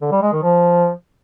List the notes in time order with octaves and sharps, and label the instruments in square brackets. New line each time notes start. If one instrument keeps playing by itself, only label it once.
[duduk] D3
G3
G#3
D#3
F3